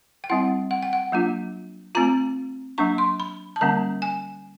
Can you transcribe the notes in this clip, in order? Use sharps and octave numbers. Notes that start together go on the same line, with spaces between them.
G5
G3 C4 E4 F#5
F#5
G5
F#5
F#3 A#3 D4 F4
A3 C4 F4 A#5
F#3 A#3 D4 C#6
C6
B5
A5
D3 G3 A#3 C#4 A#5
G#5